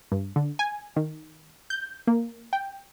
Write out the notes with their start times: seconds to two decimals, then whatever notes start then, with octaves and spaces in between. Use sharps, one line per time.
0.12 G2
0.36 D3
0.59 G#5
0.96 D#3
1.70 G6
2.07 A#3
2.53 G5